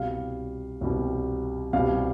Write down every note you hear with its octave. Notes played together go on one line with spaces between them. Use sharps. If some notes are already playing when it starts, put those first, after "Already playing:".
Already playing: C2 B2 G3 F5
C2 B2 G3
C2 B2 G3 F5